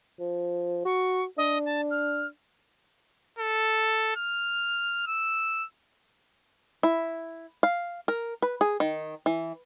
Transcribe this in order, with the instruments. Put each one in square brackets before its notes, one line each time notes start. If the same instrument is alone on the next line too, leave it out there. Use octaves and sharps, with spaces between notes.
[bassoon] F3
[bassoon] F#4 [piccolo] C#6
[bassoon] D4 [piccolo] D#5
[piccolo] A5
F6
[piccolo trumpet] A4
F6
E6
[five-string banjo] E4
F5
A#4
B4
G#4
D#3
E3